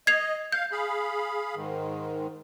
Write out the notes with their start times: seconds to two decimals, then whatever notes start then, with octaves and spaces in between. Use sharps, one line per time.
0.07 D#5 G#6 C7 F7
0.52 F5 G6
0.72 G#4 F5 B5
1.55 G#2 D#3